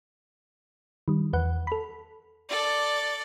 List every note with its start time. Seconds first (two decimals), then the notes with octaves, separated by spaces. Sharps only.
1.08 D#3 G3
1.33 E2 B4 F#5
1.67 A4 B5
2.49 A4 D5